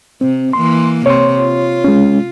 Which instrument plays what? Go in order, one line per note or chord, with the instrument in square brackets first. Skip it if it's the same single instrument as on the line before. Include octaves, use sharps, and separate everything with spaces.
[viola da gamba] C3 [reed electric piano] C4
[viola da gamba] E3 A#3 [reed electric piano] C6
[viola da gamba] C3 [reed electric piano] C#5 C6
[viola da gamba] F4
[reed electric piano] G#3 C#4